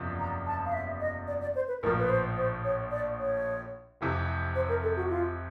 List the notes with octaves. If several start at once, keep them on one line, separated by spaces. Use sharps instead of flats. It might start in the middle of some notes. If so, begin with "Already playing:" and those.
Already playing: F#1 E2 C3 F3
A#5
A5
F5
E5
D#5
D5
D5
C5
B4
A#1 A2 F3 A#4
B4
C5
C5
C#5
D5
C#5
F1 F2 C3 E3
C5
A#4
A4
F#4
F4